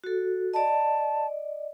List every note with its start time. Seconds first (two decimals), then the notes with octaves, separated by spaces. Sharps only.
0.04 F#4 A4
0.54 D5 D#5 A5